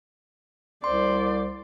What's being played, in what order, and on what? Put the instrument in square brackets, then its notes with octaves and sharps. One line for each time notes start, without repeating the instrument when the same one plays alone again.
[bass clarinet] C2 [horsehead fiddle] C5 D5 [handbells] C6